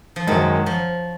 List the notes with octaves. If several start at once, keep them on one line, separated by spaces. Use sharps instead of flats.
F3
F#2 D#3 F#3 G#3
F3